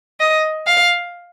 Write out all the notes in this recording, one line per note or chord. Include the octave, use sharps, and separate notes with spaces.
D#5
F5